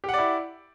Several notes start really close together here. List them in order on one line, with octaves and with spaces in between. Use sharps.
G4 F#5 D5 E4